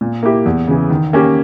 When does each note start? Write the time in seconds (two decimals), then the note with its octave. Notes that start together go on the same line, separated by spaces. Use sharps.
0.01 A#2
0.23 A#3 E4 G4
0.46 E2
0.68 C#3 E3
0.90 D#3
1.13 A#3 C#4 G4